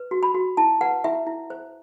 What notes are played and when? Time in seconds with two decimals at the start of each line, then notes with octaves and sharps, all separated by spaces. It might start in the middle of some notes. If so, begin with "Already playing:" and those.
Already playing: B4
0.11 F#4
0.23 B5
0.34 F#4
0.57 E4 A5
0.81 B4 F#5
1.04 E4 E5
1.27 E4
1.50 C5